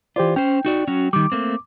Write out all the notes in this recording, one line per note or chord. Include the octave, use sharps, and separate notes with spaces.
E3 F4 G4 C5 D5
C#4 C5 G5
D#4 F#4 D5
F#3 C#4 F#4
D#3 G3 D6
A3 A#3 C4